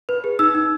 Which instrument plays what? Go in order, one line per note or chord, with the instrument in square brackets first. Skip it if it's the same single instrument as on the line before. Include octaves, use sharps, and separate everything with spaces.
[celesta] B4
G#4
D#4 E6
D#4